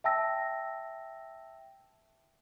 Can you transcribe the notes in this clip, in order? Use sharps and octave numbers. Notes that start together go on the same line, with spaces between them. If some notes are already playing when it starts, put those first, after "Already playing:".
E5 G5 A5 E6 A#6